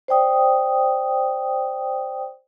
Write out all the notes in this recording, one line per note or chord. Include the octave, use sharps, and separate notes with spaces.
C5 D5 G5 D#6